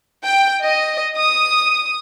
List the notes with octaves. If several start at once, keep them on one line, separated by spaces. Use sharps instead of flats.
G5
D#5
D#6